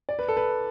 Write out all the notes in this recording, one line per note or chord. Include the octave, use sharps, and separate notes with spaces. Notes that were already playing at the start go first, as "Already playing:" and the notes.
D5
B4
A4
B4